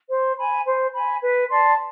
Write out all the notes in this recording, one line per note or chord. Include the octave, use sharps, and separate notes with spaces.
C5
G#5 B5
C5
G#5 B5
B4
D5 A5 C6